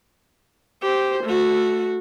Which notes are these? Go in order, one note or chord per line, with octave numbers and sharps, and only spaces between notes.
G4 C5
A3 F#4